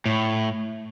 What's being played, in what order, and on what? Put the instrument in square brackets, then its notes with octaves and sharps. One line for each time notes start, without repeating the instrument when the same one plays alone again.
[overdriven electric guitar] A2